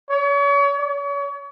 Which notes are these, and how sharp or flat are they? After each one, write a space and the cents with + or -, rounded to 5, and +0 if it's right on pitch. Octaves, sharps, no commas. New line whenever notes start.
C#5 +35
C#5 +35